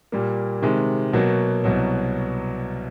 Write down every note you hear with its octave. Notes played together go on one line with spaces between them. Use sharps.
A#2 G3 A#3
C3 D#3 G#3
B2 F#3 A#3
C2 B2 F#3